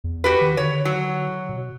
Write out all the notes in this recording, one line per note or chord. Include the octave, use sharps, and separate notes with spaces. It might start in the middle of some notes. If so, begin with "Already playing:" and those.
E2
F#4 G4 B4
D#3
D3 C#5
F#3
B2